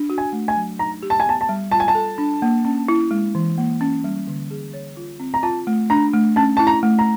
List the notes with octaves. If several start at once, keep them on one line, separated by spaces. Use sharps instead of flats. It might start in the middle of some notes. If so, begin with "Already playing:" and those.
Already playing: D4
F#4
G#5
A3
G#5
F#3
D#4 A#5
G4
A5
G#5
B3 A5
A5
G3
F4 A5
G#5
A5
A4
D4
A#3
C#4
E4
G#3
E3
A#3
C#4
G3
D3
G#4
C#5
F4
C4
A#5
F4 A5
A3
D4 A#5
A3
C#4 A5
E4 A5
A#5
A3
A#5